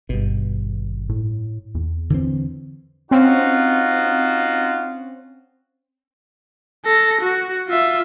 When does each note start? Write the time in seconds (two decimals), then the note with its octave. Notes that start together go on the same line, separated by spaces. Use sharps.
0.09 G#1 G2 B2
1.09 A2
1.75 E2
2.10 D3 E3 C4
3.11 C4 C#4 D#4 F4 F#4
6.85 A4 A#6
7.22 F#4
7.69 F4 E5